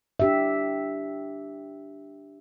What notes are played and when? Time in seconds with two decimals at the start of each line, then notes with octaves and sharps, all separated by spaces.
0.20 D4 G4 E5